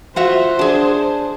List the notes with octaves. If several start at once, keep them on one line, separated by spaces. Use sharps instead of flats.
F4 F#4 C5 E5
D4 G#4